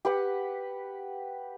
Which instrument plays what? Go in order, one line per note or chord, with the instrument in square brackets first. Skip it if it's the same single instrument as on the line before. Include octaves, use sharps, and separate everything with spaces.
[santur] G4 B4 F#5